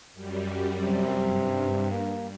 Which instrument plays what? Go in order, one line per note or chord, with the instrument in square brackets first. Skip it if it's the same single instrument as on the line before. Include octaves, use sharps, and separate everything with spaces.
[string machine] F#2 G3
[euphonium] C3
[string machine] G2
[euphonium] A#3